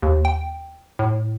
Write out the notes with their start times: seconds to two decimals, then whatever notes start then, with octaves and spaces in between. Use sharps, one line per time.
0.02 D#2
0.25 G5
0.99 A2